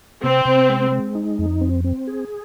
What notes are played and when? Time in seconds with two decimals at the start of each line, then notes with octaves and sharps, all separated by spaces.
0.23 C3 C4
0.45 C3
0.69 G#3
0.92 G#3
1.15 D#4
1.39 F2
1.61 C4
1.84 C4
2.07 G#4